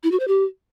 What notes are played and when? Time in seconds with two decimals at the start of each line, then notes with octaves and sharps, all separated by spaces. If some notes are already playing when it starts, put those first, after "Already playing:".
0.03 E4
0.12 F#4
0.20 C5
0.28 G4